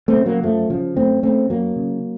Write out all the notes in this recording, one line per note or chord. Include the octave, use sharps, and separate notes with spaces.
A3 C4
C#3
F#3 A#3
F#2 F3 A3
C#3 F3
F#2 A3 C4
C#3 A3 C4
F#2 F#3 A#3
C#3